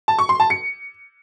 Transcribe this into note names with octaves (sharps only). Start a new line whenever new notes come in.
A5
C#6
C6
A5
C#7